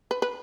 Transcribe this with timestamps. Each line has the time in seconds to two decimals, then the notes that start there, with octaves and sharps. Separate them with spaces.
0.11 B4
0.22 B4